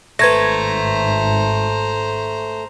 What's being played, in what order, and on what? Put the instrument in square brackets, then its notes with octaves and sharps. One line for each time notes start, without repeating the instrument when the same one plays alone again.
[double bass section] G#1 [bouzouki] A3 [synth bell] B4 G#6 A#6 [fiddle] C5 A#5